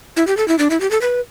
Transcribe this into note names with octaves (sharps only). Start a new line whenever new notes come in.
E4
G4
A4
E4
D4
E4
G4
A4
B4